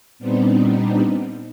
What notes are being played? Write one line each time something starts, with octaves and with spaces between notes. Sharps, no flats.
A#2 G3 B3 C4 D4 D#4